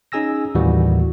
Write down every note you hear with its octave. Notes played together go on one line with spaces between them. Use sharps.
C#4 D#4 G#4 G#5 E6 A#6
D#2 A2 E3 G3 A#3 F#4